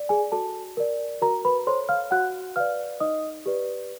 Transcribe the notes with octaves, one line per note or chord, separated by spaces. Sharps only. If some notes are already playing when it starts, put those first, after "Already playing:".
Already playing: D5
G#4 G#5
F#4 A4 A5
A#4 D5
F#4 A#4 A#5
B4 B5
A4 C5 C#5 C6
F5 F6
F#4 F#5 F#6
B4 D5 F5 F6
D#4 D#5 D#6
G4 B4 D5